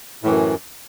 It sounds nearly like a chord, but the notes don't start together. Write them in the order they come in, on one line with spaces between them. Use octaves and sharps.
A2 E3 F#2